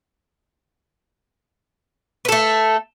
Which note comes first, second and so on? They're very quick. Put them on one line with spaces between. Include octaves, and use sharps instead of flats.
B4 A4 A3